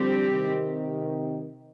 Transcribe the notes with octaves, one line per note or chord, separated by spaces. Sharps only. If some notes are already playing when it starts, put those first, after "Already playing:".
Already playing: D3 F3 G3 C4 G4
C3 D#3